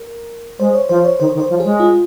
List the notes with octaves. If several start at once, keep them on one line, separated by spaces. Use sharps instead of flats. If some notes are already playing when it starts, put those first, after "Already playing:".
Already playing: A#4
G#3 C5
C#5
F3 C5
C#5
D#3 C5
D#3
C5
F3
G#3 G#4
F4